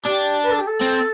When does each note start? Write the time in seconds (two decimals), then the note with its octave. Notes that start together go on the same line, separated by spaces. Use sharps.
0.04 D4 G4
0.43 B4
0.51 A4
0.58 G4
0.67 A4
0.81 C4